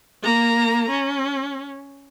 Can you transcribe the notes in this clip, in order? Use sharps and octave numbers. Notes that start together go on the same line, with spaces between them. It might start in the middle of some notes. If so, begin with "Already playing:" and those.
A#3 A#5
C#4